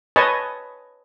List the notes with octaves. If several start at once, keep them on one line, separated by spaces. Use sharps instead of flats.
B4 C#5 D#5 G#5 A5 C#6